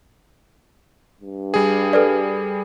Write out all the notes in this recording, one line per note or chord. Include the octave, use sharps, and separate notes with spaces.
G2
G3 G#4
A4 B4 D5